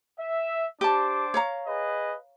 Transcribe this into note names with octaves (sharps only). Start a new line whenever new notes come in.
E5
D4 G4 C5 A5 D6
C#5 F5 A#5
G#4 B4 D#5